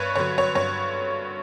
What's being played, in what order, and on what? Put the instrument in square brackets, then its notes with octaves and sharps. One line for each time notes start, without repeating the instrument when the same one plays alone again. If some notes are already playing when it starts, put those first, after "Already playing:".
Already playing: [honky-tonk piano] G2 B4 C#5
D3 F#3 C#5
C#5
G2 C#5